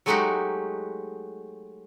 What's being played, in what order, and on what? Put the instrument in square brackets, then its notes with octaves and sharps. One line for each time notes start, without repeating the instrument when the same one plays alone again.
[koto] F#3 G#3 A3 D#4 F#4 G4